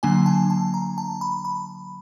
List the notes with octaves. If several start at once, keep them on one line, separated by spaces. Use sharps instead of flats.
D3 F#3 A#3 D4 G#5
A5
A5
A#5
A5
B5
B5